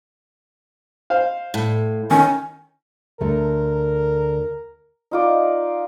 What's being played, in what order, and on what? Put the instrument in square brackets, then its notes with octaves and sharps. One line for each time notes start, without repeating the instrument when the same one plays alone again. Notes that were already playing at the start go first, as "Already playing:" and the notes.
[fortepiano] C5 F5
[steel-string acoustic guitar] A2
[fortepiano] D#3 C#4 [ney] G#5
[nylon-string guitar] D2 A3 [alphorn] A#4
[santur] D#4 F4 D5